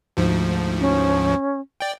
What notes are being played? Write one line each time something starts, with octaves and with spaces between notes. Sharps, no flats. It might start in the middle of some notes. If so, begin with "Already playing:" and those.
D2 G#2 F3
C#4
D5 G5